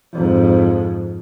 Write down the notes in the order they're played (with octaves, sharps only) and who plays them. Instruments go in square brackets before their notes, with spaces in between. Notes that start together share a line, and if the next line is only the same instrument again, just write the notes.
[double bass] F2 G#2